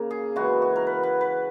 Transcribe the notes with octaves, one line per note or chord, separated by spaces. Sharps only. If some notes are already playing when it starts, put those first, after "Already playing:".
Already playing: C#3 A#3 A#4
G#4
C#3 E3 G#3 F#4
F#4
A#4
B4
B4
B4